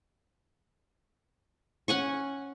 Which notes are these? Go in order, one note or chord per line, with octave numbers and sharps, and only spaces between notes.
C#4 F#5 G#5 C#6